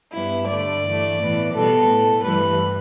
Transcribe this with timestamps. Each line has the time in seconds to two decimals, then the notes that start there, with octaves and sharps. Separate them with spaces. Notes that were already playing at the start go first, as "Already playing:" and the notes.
0.11 G2 G3 B3 E4
0.47 G2 D3 A3 D5
0.83 G2 E3 A3
1.18 A2 E3 B3
1.53 B2 G3 B3 A4
1.89 A2 A3
2.24 G2 E3 G3 B4